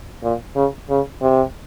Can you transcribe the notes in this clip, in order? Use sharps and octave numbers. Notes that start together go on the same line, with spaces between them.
A#2
C#3
C#3
C3